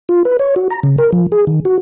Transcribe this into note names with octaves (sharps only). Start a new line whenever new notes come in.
F4
B4
C#5
F#4
A#5
C#3
A#4
F3
G#4
D#3
F#4